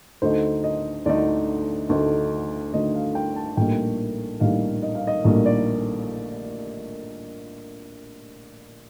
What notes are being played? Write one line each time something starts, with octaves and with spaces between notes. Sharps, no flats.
D2 D3 A3 D#4 C5
D#5
D2 D3 A3 D#4 D5
D2 D3 A3 D#4
D2 D3 A3 D#4 D#5
F5
G5
A5
A#1 A2 G3 A#3 D#4 G5
A#1 A2 G3 A#3 D#4 F5
D#5
F5
D#5
A#1 A2 G3 A#3 D#4
D5